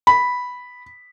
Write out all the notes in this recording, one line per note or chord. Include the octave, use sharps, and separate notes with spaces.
B5